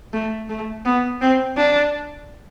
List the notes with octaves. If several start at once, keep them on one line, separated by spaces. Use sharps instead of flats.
A3
A3
B3
C4
D4